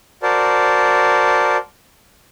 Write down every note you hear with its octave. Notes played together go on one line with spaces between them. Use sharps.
F#4 A#4 C5 D5 A5